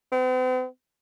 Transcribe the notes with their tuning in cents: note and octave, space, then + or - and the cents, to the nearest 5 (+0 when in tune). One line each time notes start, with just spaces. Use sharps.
C4 -45